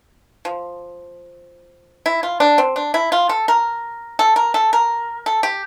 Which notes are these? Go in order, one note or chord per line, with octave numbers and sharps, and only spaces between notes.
F3
E4
F4
D4
C4
D4
E4
F4
A4
A#4
A4
A#4
A4
A#4
A4
G4